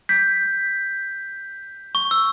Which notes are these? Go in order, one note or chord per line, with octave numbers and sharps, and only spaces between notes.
G6 B6
C#6
E6